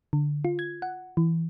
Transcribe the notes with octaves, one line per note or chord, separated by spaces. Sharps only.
D3
F4
G#6
F#5
E3